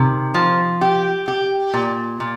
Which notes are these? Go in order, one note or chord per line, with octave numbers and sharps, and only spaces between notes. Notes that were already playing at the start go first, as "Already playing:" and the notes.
Already playing: C3 D#3
F3
G4
G4
A#2
A#2